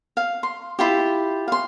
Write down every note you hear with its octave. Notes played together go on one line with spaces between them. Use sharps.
F5
C6
E4 F4 G4
F5 C6